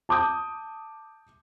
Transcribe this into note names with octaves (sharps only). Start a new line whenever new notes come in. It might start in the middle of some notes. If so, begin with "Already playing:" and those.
A5 D6 D#6 G6